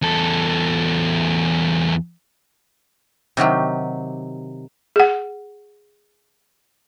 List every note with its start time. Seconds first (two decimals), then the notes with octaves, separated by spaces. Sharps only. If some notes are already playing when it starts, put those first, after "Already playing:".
0.02 E2 A4
3.37 C3 D#3 F#3 G4
4.96 G#4 F#5